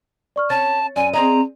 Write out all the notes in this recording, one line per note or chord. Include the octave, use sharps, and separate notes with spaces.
D5 C#6 F6
C#4 A5 A6
F#2 D5 G#5 D#7
C4 G#4 D#5 A#5